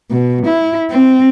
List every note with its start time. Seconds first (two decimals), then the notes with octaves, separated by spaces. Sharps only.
0.10 B2
0.45 E4
0.91 C4